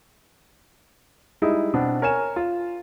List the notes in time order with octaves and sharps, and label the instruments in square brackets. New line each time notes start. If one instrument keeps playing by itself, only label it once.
[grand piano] G3 G#3 D#4 E4
B2 B3 C4 D4
A#4 C#5 G#5 E7
F4